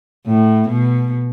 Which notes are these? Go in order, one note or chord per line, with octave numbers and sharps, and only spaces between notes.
A2
B2